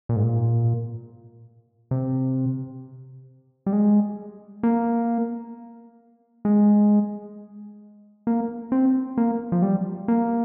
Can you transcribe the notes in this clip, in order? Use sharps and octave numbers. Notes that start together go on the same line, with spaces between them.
A#2
G#2
A#2
C3
G3
G#3
A#3
G#3
A#3
C4
A#3
F3
G3
A#3